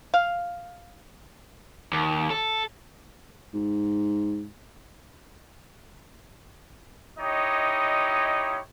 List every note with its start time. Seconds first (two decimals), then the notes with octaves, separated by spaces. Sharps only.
0.14 F5
1.93 D#2
2.30 A4
3.54 G#2
7.19 D#4 E4 G4 C#5 D#5